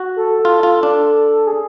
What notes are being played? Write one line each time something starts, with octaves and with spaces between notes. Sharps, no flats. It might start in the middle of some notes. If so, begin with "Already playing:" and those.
Already playing: F#4
A4
F4
F4
D4
G#4